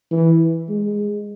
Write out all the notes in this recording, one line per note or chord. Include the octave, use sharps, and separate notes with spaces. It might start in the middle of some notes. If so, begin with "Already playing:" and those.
E3
G#3